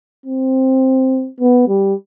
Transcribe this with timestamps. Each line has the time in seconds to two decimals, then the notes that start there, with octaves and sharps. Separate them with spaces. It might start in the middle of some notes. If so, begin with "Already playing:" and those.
0.26 C4
1.40 B3
1.68 G3